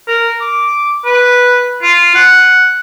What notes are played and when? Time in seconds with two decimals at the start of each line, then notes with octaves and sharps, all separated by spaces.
0.08 A#4
0.41 D6
1.05 B4
1.82 F4
2.15 F#5